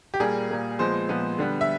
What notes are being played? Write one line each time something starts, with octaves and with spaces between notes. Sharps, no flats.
G4
A#2 G3 A#3 G#4
A#2 G3 A#3
A#2 F3 G#3 B3 C5
A#2 F3 G#3 B3
D3 G3 B3
E5